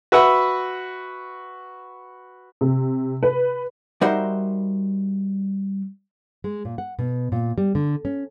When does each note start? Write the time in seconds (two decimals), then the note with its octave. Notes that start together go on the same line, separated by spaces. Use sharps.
0.12 F#4 B4 E5 F#5 B5
2.61 C3
3.23 B4
4.01 G3 D#4 F#4 A#4 C5 E5
6.44 G#3
6.65 A#2
6.78 F#5
6.99 B2
7.32 A#2
7.58 G3
7.75 D3
8.05 C#4